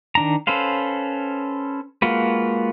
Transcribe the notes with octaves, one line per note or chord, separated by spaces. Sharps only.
D#3 D4 A#5
C#4 A4 B4 C5 F5
G#3 A#3 F4 F#4 B4